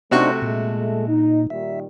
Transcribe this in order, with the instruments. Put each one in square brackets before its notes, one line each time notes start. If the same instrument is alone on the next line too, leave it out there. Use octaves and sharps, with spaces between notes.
[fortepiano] C3 F#4 C#6 [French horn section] A3 [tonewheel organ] D4 D#4 C5
[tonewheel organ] A#2 [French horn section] G#3 A3
[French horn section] D#4
[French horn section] A#2 D#3 G3 [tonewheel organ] E5